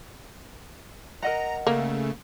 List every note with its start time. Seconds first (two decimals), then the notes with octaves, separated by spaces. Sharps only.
1.23 A#4 D#5 F#5 A#5
1.67 C#3 A3 A#3